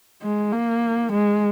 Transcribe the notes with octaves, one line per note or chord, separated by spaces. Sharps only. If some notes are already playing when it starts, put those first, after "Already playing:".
G#3
A#3
G#3